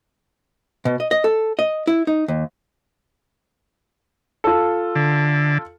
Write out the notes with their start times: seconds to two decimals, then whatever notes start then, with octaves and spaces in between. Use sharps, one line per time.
0.85 B2
1.00 D#5
1.11 D#5
1.24 A4
1.59 D#5
1.87 E4
2.07 D#4
2.28 D#2
4.44 F4 A4
4.95 D3